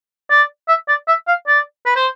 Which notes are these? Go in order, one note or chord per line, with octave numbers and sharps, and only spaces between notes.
D5
E5
D5
E5
F5
D5
B4
C5